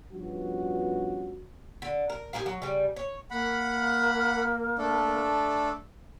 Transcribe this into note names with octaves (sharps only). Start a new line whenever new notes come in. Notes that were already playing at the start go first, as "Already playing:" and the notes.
G2 F3 B3 C#4 F#4
D3
A#4
G4 G#4 A#4 F5
F#3
C#3 G3
C#5
A#3 F#5 B5
A3 D4 A4